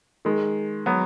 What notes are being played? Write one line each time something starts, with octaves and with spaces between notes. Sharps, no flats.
D#3 G#3
F#3 B3